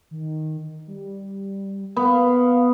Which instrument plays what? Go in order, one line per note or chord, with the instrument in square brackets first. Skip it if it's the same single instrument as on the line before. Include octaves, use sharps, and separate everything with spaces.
[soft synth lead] D#3
G3
[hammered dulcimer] B3 [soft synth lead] F5